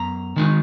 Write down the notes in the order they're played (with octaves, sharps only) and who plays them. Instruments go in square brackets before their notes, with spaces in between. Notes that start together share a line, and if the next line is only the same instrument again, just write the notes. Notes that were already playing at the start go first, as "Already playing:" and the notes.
Already playing: [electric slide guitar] F#2 B3 A#5
D#3 G#3 D#4